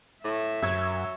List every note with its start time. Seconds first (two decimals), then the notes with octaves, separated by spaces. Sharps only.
0.24 A2 E5
0.62 F#2 F#3 E6 G#6